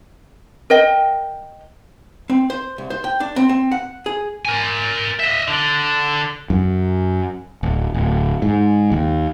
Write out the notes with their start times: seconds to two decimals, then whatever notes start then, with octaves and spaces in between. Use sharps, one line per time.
0.70 A#4 D#5 G5
2.30 C4
2.50 C5
2.78 C2
2.90 C5
3.04 G5
3.20 D4
3.36 C4
3.49 C4
3.72 F#5
4.06 G#4
4.45 A#4 G#5
5.19 D#5 E5
5.48 D3
6.50 F#2
7.63 D1
7.94 D1
8.42 G#2
8.92 D#2